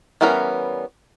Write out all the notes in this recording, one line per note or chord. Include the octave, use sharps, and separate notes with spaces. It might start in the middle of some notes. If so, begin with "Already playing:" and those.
E3 G3 B3 C#4 A#4